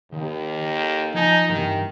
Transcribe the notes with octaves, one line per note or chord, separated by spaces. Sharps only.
D#2 D#3
A4
F3 D#4 G#5 A5
G2 D#3 E3